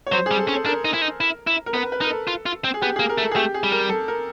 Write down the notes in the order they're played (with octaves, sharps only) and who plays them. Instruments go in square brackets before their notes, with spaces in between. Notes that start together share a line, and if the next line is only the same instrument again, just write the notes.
[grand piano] C#5
[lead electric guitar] F#3 [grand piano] C5
[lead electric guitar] G3 [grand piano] G#4
[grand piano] A4
[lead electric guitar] C#4
[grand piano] A4
[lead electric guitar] D4 [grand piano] A#4
[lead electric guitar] D#4
E4
D#4
E4
E4
[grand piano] A#4
[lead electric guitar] B3 [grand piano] B4
[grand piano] B4
[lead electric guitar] D#4 [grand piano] A#4
[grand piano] A4
[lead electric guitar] F4
F4
C4
[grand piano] G#4
[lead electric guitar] B3 [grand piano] G4
[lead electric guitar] A#3 [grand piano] G#4
[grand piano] A#4
[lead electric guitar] A3
[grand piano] A4
G#4
[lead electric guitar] A3 [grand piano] G4
[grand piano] G#4
[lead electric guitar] G3
[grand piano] A#4
A4
A#4